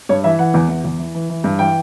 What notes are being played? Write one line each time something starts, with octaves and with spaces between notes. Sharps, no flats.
G2 C#5
E3 E5
E3 F#5
E2
E2
E2
E3
E3
E3
G2
E3 G5